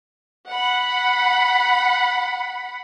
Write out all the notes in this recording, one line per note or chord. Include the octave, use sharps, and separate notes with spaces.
F#5 B5